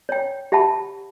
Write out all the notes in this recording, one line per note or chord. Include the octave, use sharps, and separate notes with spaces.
C#5 G5
G4 E5 F#5 A5 B5